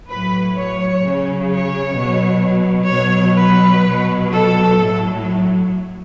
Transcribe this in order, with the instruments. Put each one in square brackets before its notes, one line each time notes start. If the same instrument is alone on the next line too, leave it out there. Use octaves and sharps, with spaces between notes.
[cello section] A2 F#3 B4
C#5
C#3 F#3
C#5
B2 F#3
B2 F#3 C#5
B4
B2 F#3
A4
A2 F#3